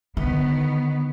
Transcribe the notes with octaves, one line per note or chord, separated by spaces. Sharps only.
D3 D#3 B3